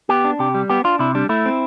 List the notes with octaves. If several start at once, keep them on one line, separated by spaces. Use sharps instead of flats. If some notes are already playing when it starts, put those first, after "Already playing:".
B3 G4
D4
C3 G4
G3
B3 G4
D4 F4
C3 E4
G3 D4
A3 E4
C4